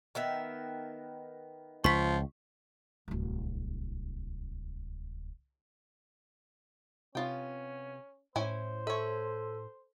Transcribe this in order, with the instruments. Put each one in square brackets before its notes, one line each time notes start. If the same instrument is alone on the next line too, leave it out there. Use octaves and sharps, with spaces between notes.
[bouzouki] D#3 B3 E5
[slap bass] C#2 [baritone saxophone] F3 [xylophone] C#6 B6
[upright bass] D1 C2
[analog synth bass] C3 [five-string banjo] B3 F4 G5 [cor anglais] C#4
[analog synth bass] A2 [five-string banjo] C#4 E4 G#5 [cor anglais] C5
[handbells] A4 [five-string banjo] C#5 E5